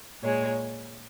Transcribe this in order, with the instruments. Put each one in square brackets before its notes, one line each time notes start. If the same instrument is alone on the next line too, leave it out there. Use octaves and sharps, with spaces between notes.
[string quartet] A#2 G#3 C#5